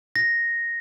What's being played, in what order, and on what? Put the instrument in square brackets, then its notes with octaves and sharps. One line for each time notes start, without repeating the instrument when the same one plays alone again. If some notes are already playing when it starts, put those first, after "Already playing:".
[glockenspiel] A#6